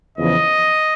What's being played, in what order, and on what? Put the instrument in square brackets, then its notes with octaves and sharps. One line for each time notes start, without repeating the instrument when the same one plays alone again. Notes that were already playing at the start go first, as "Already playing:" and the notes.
[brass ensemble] E2 C#3 F3 [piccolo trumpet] D#5